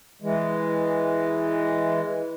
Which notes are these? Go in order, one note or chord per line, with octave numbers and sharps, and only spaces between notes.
E3 G#3